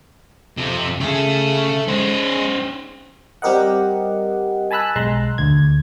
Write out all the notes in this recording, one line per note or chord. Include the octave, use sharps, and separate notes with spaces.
F2 C3 A4
C#3 G#4 A4 E5
G#3 C#4 C5
G3 C4 G4 A#4 D#5 F#5
G#5 A5 B5 E6 F#6
B1 G#3 A#5 C6 F#6
D2 G#6